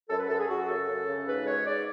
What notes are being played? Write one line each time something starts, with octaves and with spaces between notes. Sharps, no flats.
F#2 A4
B4
F#2 A4
G#4
F#2 F#4
C#3 A4
F#2
C#3
G#2 B4
G#3 C#5
G#2 D5